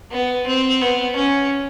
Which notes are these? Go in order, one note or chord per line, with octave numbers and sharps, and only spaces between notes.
B3
C4
B3
C#4